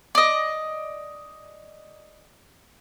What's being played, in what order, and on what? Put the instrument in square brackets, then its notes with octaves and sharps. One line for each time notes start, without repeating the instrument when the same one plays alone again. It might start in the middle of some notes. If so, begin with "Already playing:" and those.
[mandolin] D5 D#5